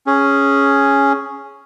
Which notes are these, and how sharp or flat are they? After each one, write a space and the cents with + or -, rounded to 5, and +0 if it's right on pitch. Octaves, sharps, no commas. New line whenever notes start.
C#4 +0 G#4 +0